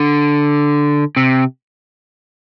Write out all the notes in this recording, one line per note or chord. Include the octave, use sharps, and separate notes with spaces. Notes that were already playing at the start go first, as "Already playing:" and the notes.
Already playing: D3
C3